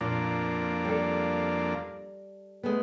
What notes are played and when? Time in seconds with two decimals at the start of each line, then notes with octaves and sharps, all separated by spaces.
0.01 F2 A#2 A#3 D4
0.85 G3 A4
2.63 G#3 A3 B3